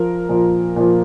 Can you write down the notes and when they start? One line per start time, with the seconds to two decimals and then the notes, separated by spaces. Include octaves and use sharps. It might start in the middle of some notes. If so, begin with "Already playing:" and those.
Already playing: F3 A#4
0.29 A#2 F3
0.76 A#2 F3